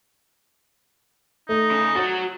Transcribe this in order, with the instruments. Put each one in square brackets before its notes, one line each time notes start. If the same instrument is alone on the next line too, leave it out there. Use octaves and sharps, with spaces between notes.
[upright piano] A3 [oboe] D#4
[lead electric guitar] C#3
[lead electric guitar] F#4 C#5 [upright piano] A6